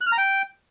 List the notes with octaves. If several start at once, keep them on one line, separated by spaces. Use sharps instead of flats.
F#6
F6
A#5
G5